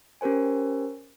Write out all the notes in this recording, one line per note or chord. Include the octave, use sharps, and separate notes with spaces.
C#4 G4 A#4 C5 G#5